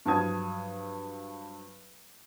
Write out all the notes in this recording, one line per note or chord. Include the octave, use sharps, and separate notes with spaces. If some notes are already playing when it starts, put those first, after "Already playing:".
G2 F3 F#3 A5 D#6 G#6